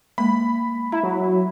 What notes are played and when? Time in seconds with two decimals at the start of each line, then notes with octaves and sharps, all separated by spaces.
0.18 G#3 A#3 B5
0.92 E4 A#5
1.03 F#3